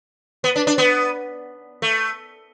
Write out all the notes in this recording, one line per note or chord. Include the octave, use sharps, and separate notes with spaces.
B3
D4
D4
B3
A3